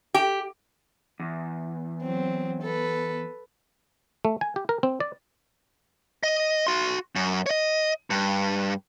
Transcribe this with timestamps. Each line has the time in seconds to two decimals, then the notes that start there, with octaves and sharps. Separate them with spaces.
0.14 G4
1.20 E2
2.03 F#3 C4
2.62 A4 B4
4.25 A3
4.41 G#5
4.56 G4
4.69 A#4
4.83 C4
5.00 D5
6.23 D#5
6.67 F#4 C6
7.16 F#2
7.46 C#5 D#5
8.10 G2